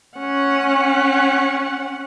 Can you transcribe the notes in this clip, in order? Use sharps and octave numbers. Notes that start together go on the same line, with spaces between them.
C#4 F#5